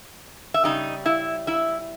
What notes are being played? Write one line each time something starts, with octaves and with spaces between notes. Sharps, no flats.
E5
C#3 G3 D#4 D#5
E4 E5
E4 E5